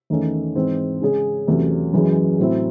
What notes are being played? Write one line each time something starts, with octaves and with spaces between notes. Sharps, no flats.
E2 D#3 A3 C#4
G#2 E3 C4
C#3 G#3 C#4 G#4
E2 C3 F#3 A3 C#4
F#2 E3 G#3 C#4
A2 F#3 C4 E4